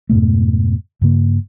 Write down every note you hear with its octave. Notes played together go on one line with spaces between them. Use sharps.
F2 G#2 B2 A3
G2 C#3 A#3